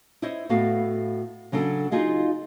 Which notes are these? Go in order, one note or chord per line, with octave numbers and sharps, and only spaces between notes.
E4 C5 C#5 D#5
A2 B3 F#4 A4 F5
C#3 F#3 D4 A4
D#4 F4 F#4 G#4 D#5 F5